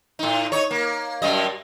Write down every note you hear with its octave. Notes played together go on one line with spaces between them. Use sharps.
A2 D#4
D#4 C#5
A#3
F#2 G3 D#5